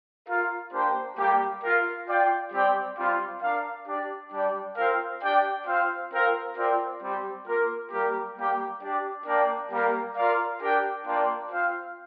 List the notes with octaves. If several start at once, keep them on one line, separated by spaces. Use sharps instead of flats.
F4 A#4 F5
A#3 D4 G4 C5 G5
G3 A#3 G4
F4 A#4 F5
F4 D5 G5
G3 C4 G4 D5 G5
G3 C4 F4
D4 A#4 F5
D4 G4 D5
G3 D4 G4 D5 G5
C4 F4 A#4 F5
D4 G4 D5 G5
C4 F4 C5 F5
C4 F4 A#4 F5
C4 F4 A#4 D5 G5
G3 C4 G4
A#3 F4 A#4
G3 A#3 G4 A#4
G3 A#3 G4
D4 G4 D5
A#3 D4 A#4 D5 G5
G3 A#3 G4 A#4
F4 A#4 D5 F5
D4 G4 A#4 G5
A#3 D4 F4 D5 G5
C4 F4 C5 F5